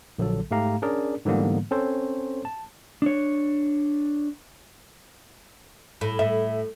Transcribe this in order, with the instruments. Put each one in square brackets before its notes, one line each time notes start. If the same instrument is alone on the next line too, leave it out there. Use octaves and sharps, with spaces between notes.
[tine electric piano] A#1 D3 F#3 A4
G#2 A3 G4 F5 A#5
C#4 D4 G#4 A#4 D5
G#2 D3 E3 G3 A#3 B3
C4 C#4 A4 C5 C#5
A5
[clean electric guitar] D4 C#5
[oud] A2
[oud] A2 [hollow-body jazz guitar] E5